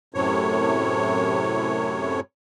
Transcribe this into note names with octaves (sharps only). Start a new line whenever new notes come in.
F#2 A2 C3 C#5